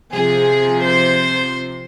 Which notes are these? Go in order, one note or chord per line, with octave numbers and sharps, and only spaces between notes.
C3 F3 G#4
C5